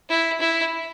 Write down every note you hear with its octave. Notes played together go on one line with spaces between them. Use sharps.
E4
E4